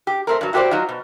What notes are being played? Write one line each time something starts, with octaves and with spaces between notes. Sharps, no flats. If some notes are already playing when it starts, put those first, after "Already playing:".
G4
A3 C4 A#4
G2 F#3
E4 F#4 G4 A#4 C5 D5
F#3 D#4 F4
B2